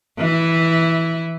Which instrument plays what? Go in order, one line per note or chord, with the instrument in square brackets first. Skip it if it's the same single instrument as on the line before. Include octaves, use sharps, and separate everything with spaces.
[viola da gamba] E3 E4